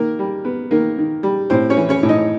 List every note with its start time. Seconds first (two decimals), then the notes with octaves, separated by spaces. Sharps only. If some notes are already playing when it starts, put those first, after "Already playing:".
Already playing: D#3 A#3 A#4
0.19 G3
0.45 B3
0.71 D#3 A#3 A#4
0.98 D#3
1.23 G3
1.50 A2 C4 C5
1.70 C#4 C#5
1.77 E3
1.89 C#4 C#5
2.03 A2
2.09 D#4 D#5